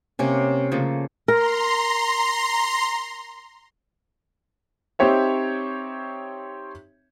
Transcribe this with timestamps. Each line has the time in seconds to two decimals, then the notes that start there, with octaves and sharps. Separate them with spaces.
0.19 C3 A#3 C#4
0.72 C#3 F3 A3 A#3
1.28 A#4 A#5 C6
4.99 C4 D#4 G4 C#5 E5